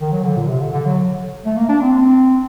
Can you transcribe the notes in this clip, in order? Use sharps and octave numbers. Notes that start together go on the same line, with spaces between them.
D#3
F#3
D3
A#2
C3
D3
D3
F#3
A3
A#3
D4
C4